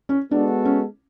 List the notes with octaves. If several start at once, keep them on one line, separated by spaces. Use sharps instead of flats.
C#4
G#3 B3 D4 F#4 A4
C#4